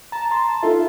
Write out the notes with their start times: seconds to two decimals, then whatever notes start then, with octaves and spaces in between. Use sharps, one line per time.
0.12 A5 A#5
0.31 A#5 C6
0.63 D#4 F4 A4 E5